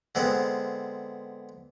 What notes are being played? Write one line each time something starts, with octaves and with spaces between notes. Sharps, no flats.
D3 G#3 B3 C4